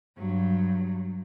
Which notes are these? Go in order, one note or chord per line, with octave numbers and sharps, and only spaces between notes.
G2 F#3